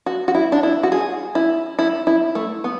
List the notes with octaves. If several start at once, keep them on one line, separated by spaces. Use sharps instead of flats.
F#4
F#4
E4
D4
E4
F#4
G#4
E4
E4
E4
A3
B3